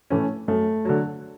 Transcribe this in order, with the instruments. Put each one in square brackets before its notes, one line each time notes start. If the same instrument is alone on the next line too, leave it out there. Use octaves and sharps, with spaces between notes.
[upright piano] A2 E3 A3 C#4
[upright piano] F#2 [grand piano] A3
[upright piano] D3 F#3